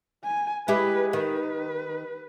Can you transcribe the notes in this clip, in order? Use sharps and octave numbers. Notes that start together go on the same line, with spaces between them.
G#5
G#3 E4 G4 B4
D#3 B4